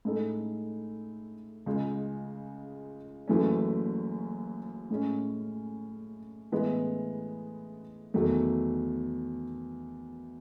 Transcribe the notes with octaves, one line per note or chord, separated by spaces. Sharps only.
A2 G#3 D#4 A4
C#2 C#3 G#3
F#1 F#2 E3 A3 C#4
A2 G#3 C#4
A2 E3 G#3 B3 E4
E2 D#3 F#3 A3